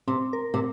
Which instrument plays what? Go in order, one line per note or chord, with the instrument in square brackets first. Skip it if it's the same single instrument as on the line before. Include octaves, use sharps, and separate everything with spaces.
[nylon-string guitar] C3 [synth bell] C4
[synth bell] A#4
[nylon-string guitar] C3